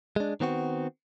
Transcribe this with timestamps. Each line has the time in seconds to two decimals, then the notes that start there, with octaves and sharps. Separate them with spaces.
0.16 G#3 D4
0.40 D#3 B3 C4 F#4